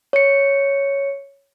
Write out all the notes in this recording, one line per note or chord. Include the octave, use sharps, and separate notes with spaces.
C#5 C#7